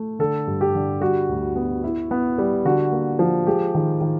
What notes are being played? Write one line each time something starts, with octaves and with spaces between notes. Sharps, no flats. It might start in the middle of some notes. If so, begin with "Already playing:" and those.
Already playing: A3
D3 A4
G2
G4
D3
G3 F#4
D2
B3
E4
B3
G3
D3 F#4
A#3
F3
G#3 G4
D#3
D#3